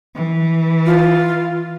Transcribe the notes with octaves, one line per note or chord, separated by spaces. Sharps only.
E3
F4